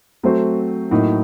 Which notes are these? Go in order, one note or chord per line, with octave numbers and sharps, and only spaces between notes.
F#3 A3 C4 F#4 C5
A2 F#3 A#3 D#4